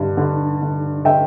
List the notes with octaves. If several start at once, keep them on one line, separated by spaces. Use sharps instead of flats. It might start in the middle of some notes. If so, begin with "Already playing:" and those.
Already playing: G2 D3
D3
D3
D3 E5 G5